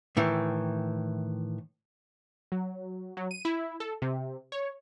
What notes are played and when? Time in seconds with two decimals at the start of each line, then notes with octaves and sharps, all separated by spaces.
0.17 A2 D#3 E3
2.52 F#3
3.17 F#3
3.31 D#7
3.45 E4
3.80 A4
4.02 C3
4.52 C#5